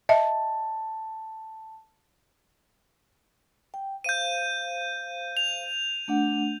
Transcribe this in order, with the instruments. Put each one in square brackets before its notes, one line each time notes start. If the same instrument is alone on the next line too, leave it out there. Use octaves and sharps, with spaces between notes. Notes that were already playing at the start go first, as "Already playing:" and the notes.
[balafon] D#5 E5 [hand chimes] A5
[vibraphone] G5
[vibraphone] C5 F5 [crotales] G6 D#7
[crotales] F7
[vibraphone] A3 D4 F#5